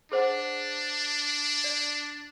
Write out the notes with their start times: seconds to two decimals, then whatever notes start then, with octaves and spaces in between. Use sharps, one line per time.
0.12 D4 G#4 C5 F#5
1.64 D5